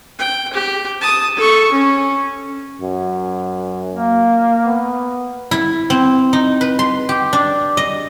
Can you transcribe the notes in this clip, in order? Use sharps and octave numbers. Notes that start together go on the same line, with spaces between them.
G5
G4
A5 D#6
A4 C#6
C#4
F#2
A#3
B3
E4
C4
D#4
B4
C6
G4
D4
D#5